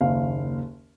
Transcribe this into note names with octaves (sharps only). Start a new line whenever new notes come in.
F#1 D#2 F5